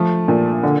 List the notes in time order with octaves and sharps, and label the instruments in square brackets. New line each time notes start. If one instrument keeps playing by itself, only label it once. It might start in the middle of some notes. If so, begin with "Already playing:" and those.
Already playing: [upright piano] F3 [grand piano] A3
[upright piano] A#2
D3